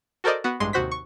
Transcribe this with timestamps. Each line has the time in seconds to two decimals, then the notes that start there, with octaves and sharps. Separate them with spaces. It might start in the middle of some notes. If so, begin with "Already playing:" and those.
0.24 F#4 A4 A#4 C5 D5 D#5
0.44 B3 F#4
0.60 A1 G2 G#3 C6
0.73 D#2 C3 F#4 C5 B6
0.91 C#6